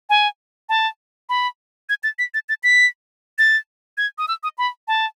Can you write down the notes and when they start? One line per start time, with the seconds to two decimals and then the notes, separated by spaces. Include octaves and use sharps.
0.10 G#5
0.69 A5
1.29 B5
1.89 G#6
2.04 A6
2.19 B6
2.34 A6
2.49 A6
2.64 B6
3.38 A6
3.98 G#6
4.18 D#6
4.28 E6
4.43 D#6
4.58 B5
4.88 A5